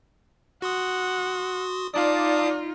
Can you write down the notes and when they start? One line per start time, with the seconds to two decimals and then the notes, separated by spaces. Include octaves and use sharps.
0.62 F#4 F#5 C6 D#6
1.93 D#4 F4 D5 F5 A5 D#6